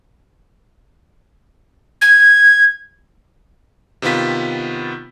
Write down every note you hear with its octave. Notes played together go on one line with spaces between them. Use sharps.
G#6
C3 D#3 B3 F4 B6